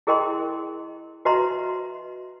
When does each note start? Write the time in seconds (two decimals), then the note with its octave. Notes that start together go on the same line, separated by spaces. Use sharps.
0.07 E4 G#4 A#4 D#5 G5 C6
1.25 F#4 B4 D#5 E5 A#5 C6